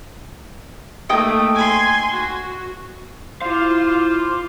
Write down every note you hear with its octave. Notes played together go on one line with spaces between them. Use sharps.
A3 A#3 D#4 G5 D#6
G#5 C6
F#4
E4 F4 C5 F5 D6